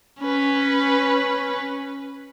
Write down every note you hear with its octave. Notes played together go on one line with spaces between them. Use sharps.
C#4 B4